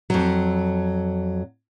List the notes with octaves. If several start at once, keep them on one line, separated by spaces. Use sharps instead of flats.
F2 F#3